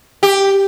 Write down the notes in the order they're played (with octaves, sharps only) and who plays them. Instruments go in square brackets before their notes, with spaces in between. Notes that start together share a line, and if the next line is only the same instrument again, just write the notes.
[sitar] G4